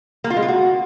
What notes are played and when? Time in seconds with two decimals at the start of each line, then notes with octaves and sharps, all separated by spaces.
0.24 A#3
0.30 F4
0.36 G#3
0.42 F4
0.48 F#4